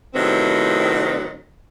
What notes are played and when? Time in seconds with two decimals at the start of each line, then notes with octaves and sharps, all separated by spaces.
0.14 A2 C3 D#3 F#3 B3 C4